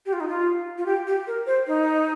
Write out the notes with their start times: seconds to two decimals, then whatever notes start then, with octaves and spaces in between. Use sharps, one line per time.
0.06 G4
0.13 F4
0.20 D#4
0.28 F4
0.78 F4
0.86 G4
1.07 G4
1.27 A#4
1.47 C5
1.67 D#4